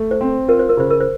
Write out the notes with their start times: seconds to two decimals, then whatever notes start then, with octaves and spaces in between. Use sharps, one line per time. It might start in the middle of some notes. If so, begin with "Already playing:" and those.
Already playing: A3
0.11 C5
0.21 C4
0.48 F4 A#4
0.59 C5
0.69 A#4
0.77 C#3 C5
0.90 A#4
1.00 C5